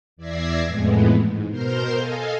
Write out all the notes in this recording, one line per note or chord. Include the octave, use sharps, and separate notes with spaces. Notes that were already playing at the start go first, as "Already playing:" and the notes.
E2 D5 E5 G#6 A#6 C7
F2 A2 E3 G#3 B3
G#2
B2 A#4 C5 C6 F6 G6
A4 D#5 F5 G#5